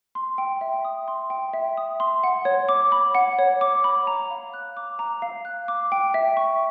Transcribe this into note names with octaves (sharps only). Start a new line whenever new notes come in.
C6
G5
E5
D#6
C6
G5
E5
D#6
C6
F#5
C#5
D6
B5
F#5
C#5
D6
B5
A#5
F5
F#6
D6
A#5
F5
F#6
D6
G5
E5
C#6